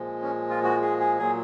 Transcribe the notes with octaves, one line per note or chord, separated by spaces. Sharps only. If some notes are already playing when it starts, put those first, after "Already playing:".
Already playing: A#2 F3 G#3
C#4
F4
F#4
G#4
G#4
A#2 F#3 G#4